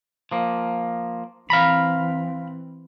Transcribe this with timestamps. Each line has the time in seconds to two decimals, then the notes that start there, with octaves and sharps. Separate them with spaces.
0.32 F3 A#3
1.50 E3 C4 F5 A#5 B5